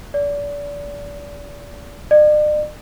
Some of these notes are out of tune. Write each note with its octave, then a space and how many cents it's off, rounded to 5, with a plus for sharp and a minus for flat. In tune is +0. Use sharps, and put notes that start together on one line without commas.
D5 -30
D5 +45